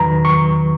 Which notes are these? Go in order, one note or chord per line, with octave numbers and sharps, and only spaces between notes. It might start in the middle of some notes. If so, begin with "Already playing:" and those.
Already playing: E2 D#3 F#3 B4 A#5
C#6